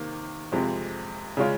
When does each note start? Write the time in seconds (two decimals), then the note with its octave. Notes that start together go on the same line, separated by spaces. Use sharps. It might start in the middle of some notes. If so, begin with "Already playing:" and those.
Already playing: C3 D#3 A#3
0.52 F2 C3 F3 G#3
1.37 C#3 G#3 C#4 F4